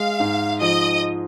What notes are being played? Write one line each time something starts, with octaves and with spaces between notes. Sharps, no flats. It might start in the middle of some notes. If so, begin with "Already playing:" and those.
Already playing: G#3 F5
G#2
F3 D#5